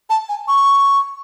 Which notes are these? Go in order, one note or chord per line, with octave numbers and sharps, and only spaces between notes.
A5
G#5
C#6